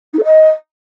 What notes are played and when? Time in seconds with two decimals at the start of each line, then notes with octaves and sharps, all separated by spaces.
0.13 D#4
0.18 A4
0.24 D#5